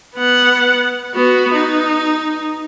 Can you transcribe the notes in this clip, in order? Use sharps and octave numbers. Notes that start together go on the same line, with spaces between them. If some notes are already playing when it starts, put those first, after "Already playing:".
B3 F#5
B3 F#4
D#4